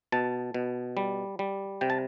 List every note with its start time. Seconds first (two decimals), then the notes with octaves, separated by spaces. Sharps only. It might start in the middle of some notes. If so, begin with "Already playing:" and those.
0.12 B2 A5
0.54 B2
0.97 G3
1.39 G3
1.81 C3 G5
1.90 A5